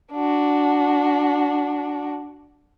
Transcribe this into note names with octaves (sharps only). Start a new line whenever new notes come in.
D4 F#4